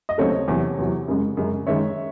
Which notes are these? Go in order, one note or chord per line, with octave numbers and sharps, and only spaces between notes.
D#5
D#2 C#3 F#3 A3 C4 A4 C#5
E2 C3 F#3
E2 C3 F#3
F#2 C#3 G#3
F#2 C#3 G#3
F#2 D#3 G#3 C#5 E5